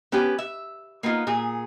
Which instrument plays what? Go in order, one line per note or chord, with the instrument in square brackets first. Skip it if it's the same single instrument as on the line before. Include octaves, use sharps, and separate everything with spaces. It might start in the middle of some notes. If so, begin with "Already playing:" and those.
[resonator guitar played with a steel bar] B3 C#4 G4 B4
E5
A#3 B3 D#4 F4
A#2 G#4